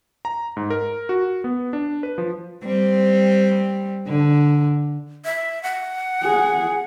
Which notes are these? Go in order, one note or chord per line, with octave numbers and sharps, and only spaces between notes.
A#5
G#2
A#4
F#4
B3
D4
B4
F3
G3 C4
D3
E5
F#5
G#4